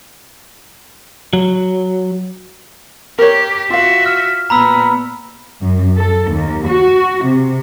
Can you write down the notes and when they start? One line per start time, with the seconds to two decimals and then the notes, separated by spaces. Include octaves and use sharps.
1.33 F#3
3.19 G4 A#4 C#5
3.70 F4 F#4 E5 F5
4.06 F6
4.50 A#2 B3 A#5 B5 E6
5.62 F#2
5.96 A4
6.30 D#2
6.67 F#4
7.25 C3